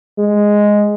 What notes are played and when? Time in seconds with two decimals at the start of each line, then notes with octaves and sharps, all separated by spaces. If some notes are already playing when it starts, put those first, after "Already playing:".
0.18 G#3